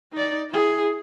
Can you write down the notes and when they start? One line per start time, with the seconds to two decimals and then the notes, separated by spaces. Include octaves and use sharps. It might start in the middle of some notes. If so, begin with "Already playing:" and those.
0.13 D#4 D5
0.50 E4 G#4